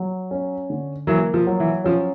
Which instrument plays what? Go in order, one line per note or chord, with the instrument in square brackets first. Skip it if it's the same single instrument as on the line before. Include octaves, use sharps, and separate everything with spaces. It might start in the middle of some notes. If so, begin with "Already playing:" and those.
Already playing: [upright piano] F#3
C#4
D3
[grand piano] E3 F#3 [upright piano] A#3
[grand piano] F3
[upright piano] F#3
[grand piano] E3
[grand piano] F3 [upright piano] C#4